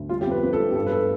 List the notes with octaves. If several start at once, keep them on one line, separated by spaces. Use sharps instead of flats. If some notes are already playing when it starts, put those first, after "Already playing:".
Already playing: D2
G3 F4
G4
F2 B4
F2 B4
A4
G3
G4
G2 A4
B4
A4